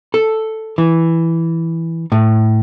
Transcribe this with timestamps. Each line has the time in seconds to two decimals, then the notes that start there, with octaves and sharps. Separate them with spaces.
0.14 A4
0.78 E3
2.12 A2